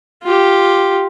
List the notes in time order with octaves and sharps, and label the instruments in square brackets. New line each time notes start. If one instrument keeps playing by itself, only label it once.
[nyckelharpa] F4 G4